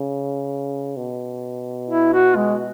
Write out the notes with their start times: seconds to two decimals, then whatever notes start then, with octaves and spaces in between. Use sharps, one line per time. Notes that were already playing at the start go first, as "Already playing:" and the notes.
Already playing: C#3
0.97 B2
1.90 E4
2.13 F#4
2.36 G#3